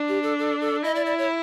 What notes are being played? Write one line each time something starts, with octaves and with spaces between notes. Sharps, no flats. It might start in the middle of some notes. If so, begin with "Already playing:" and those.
Already playing: D4
G4
A4
A4
A4
E4 D#5
D5
D5
C#5